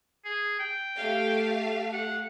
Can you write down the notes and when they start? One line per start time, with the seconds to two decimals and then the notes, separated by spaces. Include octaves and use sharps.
0.25 G#4
0.59 G5
0.96 A3 G4 F5
1.93 F#5